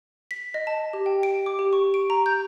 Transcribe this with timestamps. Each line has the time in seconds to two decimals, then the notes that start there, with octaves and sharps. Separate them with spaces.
0.31 B6
0.54 D#5
0.67 A5
0.93 G4
1.06 G5
1.23 D7
1.46 D6
1.59 G4
1.73 C#6
1.94 D7
2.10 A#5
2.26 G6